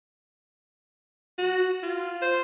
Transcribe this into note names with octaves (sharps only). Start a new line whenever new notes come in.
F#4
F4
C5